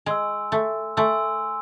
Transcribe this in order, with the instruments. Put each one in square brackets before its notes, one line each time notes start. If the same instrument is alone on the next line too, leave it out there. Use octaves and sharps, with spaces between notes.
[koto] G#3 [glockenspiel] G#5 C6 E6
[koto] A3
[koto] A3 [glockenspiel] G#5 C6 E6